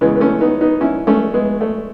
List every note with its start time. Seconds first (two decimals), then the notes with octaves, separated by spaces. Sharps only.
0.01 E2 C#3 E3 G#3 B3
0.16 B3
0.20 A3 C#4
0.41 B3 D#4
0.61 B3 D#4
0.81 C#4 E4
1.07 A3 C#4
1.34 G#3 B3
1.61 A3